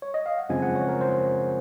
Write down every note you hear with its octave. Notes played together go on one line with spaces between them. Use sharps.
C#5
D#5
F5
F#5
F#2 C#3 F3 G#3 C4 G#5
F#5
C#5
A#4
C5